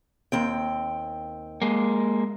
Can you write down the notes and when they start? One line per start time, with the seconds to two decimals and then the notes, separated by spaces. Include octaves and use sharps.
0.32 D#2 C4 G5
1.62 G#3 A#3